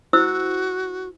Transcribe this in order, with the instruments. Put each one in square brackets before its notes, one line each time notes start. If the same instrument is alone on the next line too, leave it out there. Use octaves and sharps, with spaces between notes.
[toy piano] E4 C5 E6 [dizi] F#4